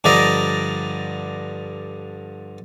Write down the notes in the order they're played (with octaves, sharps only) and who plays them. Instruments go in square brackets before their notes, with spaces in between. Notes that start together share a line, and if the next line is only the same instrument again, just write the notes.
[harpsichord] G2 D3 F3 D5 D#5 A#5